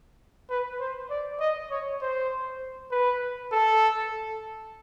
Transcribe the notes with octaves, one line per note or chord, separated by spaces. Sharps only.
B4
C5
D5
D#5
C#5
C5
B4
A4